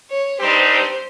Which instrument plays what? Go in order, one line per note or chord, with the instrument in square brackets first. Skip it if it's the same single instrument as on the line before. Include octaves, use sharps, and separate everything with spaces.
[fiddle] C#5
[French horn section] G2 G3 C4 D#4 G4 [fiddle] C5
[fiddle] C5